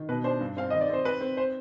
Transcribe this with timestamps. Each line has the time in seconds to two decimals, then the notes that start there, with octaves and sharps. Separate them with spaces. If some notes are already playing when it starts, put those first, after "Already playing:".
Already playing: D#3
0.09 B2 B4
0.24 D4 C5
0.41 G2
0.57 C4 F5
0.70 D#3 D#5
0.81 D5
0.90 C4 C5
1.05 C4 B4
1.21 C4
1.37 C5